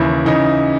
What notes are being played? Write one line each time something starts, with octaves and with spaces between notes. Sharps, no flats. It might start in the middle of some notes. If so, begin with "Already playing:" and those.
Already playing: D#2 C#3 E3 E4
C#3 E3 D#4